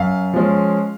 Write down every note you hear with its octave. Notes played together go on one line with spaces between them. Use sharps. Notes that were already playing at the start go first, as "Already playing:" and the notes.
Already playing: F#2 F5
F3 G#3 C#4